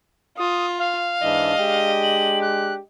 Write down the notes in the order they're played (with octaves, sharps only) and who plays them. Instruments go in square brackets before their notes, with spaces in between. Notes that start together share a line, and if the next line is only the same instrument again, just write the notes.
[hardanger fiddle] F4 [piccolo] D#6
[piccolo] F5
[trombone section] G#2 E3 D4 [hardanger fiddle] D#5
[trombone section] G#3 D4 G4
[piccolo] F#7
F#6